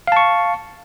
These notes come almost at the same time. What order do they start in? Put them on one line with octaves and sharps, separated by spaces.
F5 A5 C#6